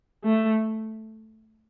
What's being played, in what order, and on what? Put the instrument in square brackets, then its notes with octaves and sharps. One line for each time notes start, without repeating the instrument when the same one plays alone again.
[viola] A3